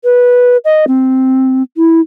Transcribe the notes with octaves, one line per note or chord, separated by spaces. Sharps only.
B4
D#5
C4
E4